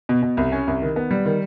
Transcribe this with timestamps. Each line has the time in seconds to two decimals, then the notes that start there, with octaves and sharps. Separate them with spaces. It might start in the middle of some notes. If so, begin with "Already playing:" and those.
0.09 B2
0.22 B2
0.37 C2
0.52 C#4
0.67 C2
0.82 D#3
0.96 B3
1.11 G3
1.25 D#3